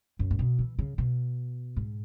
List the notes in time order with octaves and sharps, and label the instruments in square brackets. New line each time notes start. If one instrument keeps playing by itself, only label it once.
[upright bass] F#2
G#2
B2
E3
C#3
B2
G#2